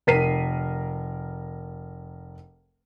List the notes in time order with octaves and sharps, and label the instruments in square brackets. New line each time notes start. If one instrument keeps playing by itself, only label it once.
[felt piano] F1 A#4 B6 C7 D#7